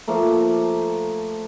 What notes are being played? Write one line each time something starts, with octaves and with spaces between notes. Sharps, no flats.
F3 A3 A#3